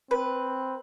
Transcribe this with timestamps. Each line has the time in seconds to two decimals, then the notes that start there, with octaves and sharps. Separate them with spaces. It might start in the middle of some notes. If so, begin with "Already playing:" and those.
0.11 C4 B4